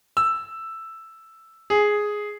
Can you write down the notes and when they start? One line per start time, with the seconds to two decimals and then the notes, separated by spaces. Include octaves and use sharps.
0.17 E6
1.70 G#4